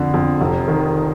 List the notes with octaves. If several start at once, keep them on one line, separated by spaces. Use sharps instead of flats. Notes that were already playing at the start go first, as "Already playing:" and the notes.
Already playing: F2 D3
F2
F1
D#3